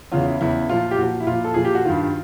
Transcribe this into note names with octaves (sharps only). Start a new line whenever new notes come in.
E2 C#3 E3 F4
E4
E2 C#3 E3 E4
A#2 F3 F4
G4
A#2 F3 F#4
E4
A#2 F3 F4
A4
A#2 F3 G#4
G4
F#4
G2 D#3 F4